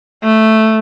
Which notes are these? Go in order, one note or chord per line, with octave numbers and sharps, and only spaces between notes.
A3